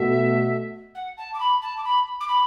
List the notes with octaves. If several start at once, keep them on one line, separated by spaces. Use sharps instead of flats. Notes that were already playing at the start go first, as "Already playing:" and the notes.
Already playing: B2 A3 F#4 E5
F#5
A5
D6
B5
A5
D6
B5
D6
B5